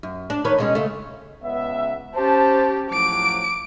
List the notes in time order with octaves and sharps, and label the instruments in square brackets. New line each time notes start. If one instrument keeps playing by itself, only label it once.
[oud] F#2
D4
D#3 B4 C#5
B2 G#3 C#4
C#3 A3
[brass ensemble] C#2 B3 E5
[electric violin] C#4 G4 [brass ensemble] C5 A5
[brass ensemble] A2 F3 F#3 [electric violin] D6 D7